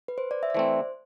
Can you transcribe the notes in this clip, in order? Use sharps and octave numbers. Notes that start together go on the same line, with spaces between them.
B4
C5
D5
E5
D5
E3 A3 C4 C5